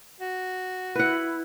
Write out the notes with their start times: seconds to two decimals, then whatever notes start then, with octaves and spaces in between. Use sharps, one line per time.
0.20 F#4
0.95 E4 B4 F#5